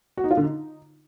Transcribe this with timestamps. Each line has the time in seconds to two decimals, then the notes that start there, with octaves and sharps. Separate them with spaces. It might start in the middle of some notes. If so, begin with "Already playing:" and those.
0.17 F#4
0.24 D#4
0.31 F4
0.37 D3
0.44 D#4